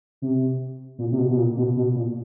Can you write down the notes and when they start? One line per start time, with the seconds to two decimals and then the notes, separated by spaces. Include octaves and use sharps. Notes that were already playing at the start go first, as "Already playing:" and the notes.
0.22 C3
0.99 A#2
1.12 C3
1.18 B2
1.30 B2
1.38 A#2
1.57 B2
1.76 B2
1.96 A#2